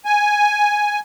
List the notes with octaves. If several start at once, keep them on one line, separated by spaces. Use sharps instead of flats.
G#5